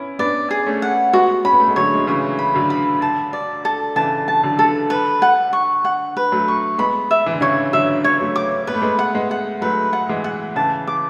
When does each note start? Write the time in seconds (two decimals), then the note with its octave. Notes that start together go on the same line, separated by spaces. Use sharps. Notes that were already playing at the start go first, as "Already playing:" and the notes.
Already playing: B3 C#4 E4
0.19 B3 D4 D5
0.51 G#4
0.66 A3 C#4
0.82 F#5
1.13 G#3 B3 F#4
1.44 C#4 B5
1.52 B3
1.60 A3
1.68 G#3
1.76 D3 F#3 C#5
1.94 G#3
2.00 F#3
2.07 C#3 E3 C#5
2.39 B5
2.55 D3 F#3
2.70 B5
3.02 A5
3.33 D5
3.65 A4
3.96 C#3 E3 A5
4.28 A5
4.43 D3 F#3
4.59 A4
4.90 B4
5.22 F#5
5.53 C#6
5.85 F#5
6.17 B4
6.32 F#3 A3
6.48 C#6
6.78 G#3 B3 B5
7.11 E5
7.26 E3
7.33 D3
7.41 C#3 E3 C#5
7.73 D3 F#3 E5
8.04 C#5
8.20 F#3 A3
8.36 D6
8.67 B3 B4
8.74 A3
8.82 G#3 B3
8.99 F#5
9.15 G#3 B3
9.31 F#5
9.61 F#3 A3 B4
9.93 F#5
10.09 E3 G#3
10.24 F#5
10.56 C#3 E3 A5
10.87 D6